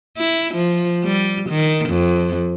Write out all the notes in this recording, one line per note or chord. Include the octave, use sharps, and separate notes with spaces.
E4
F3
G3
D#3
F2